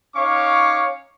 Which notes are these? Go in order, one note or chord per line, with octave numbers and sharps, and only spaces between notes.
C#4 D#4 C#5 F5 C#6 D6